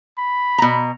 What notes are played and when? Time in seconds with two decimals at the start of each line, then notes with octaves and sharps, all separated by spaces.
0.18 B5
0.58 B2 A#5